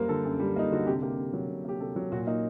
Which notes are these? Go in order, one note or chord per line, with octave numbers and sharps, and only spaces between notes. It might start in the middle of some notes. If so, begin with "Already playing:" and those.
Already playing: F#2 G3 A#3 A#4 C5
D3 A4
F#2
G3
A#3 D#4
D3 F#4
C3 G4
A#3 G4
C3
F#3
C3
A#3 G4
C3 A4
F#3
A#2 F#4
A#3 D#4